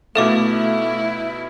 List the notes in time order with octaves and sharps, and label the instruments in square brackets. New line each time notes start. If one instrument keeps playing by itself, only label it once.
[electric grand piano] B2 F5 [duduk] A3 [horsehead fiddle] E4 [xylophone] A4 E5 D6